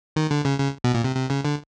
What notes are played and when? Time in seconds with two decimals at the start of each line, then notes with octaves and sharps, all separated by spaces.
0.16 D#3
0.31 D3
0.45 C#3
0.59 C#3
0.84 B2
0.94 A#2
1.04 C3
1.16 C3
1.30 C#3
1.45 D3